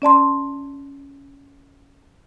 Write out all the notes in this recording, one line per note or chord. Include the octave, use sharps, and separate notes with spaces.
C#4 D5 A5 C6